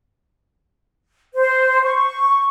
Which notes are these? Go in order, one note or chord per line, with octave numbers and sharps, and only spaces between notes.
C5
C#6